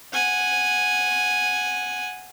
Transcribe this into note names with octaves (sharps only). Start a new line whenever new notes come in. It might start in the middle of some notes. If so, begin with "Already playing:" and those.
F#5 G#5